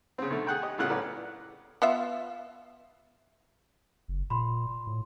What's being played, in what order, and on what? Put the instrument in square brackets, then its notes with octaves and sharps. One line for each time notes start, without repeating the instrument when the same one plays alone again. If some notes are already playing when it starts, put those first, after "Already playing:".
[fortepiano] C#3 C4
B1 D3 A3
G#4 F#5 G5
G4 D#5
C2 A2 C#3 F4 G#4 F#5
A2 F#3 C#4 B4 D5 F#5
[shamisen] B3 F4 E5
[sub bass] F#1
[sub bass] A#2 [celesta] B5 C6
[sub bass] A2